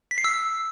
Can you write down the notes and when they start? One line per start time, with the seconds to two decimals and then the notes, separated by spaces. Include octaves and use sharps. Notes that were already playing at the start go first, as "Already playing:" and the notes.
0.11 B6
0.18 C7
0.24 E6